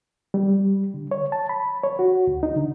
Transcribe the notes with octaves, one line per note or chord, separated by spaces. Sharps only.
G3
D3
C#5
A5
B5
C#5
F#4
D2
D#4
D3